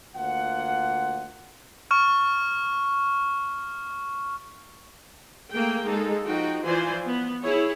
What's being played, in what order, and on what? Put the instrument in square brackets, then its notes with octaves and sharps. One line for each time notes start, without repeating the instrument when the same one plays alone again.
[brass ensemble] D2 A#3 F4 F#5
[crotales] C#6 F6
[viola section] A3 A#3 G#4 G5
G#3 A#3 D#4 A4
F3 D#4 F#4 G5
E3 F3 F4 C5 D5 G#5
B3
E4 G#4 C#5